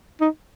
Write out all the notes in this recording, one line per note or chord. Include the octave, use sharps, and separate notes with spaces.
D#4